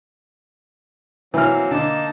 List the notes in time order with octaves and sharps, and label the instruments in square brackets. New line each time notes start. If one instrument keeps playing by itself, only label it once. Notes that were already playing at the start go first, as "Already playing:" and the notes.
[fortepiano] E3 F6 [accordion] F#3 A#3 C4
[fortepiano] D3 [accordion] A#3 D#4 A5